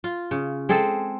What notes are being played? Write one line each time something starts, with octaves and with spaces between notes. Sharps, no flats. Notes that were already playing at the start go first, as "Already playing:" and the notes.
F4
C#3
G#3 C4 G#4 A4